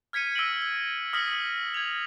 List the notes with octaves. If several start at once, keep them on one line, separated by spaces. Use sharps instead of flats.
F6 G#6 B6 C#7 D#7
E6 A#6 D7 D#7 F#7
E6
D#6 F6 A#6 B6 C#7 F#7
G#6 F7